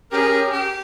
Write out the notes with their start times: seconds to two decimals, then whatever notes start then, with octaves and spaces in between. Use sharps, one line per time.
0.12 C#4 G4 G#4 A#4
0.52 G4